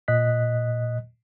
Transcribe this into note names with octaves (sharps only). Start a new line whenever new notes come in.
A#2 D#5 F#6 B6